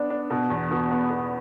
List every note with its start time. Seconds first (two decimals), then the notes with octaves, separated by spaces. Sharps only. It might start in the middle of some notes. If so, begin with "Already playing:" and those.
Already playing: B3 D4
0.10 D4
0.30 B2
0.50 E2
0.71 B2
0.91 B3
1.10 B2